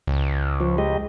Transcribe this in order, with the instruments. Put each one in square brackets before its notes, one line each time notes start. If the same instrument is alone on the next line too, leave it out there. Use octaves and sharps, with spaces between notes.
[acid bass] C#2
[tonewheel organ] F3
G#3 G4 D#5